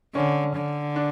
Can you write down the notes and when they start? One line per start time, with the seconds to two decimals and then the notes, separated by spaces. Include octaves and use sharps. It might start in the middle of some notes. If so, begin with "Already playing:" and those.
0.15 D3 C#4
0.56 D3
0.96 D4